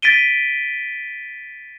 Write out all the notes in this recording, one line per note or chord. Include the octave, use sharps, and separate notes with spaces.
A6 B6 D7 D#7 G7